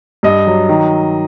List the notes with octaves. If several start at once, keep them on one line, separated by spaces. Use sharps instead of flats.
G2 D#5
F#3
D#3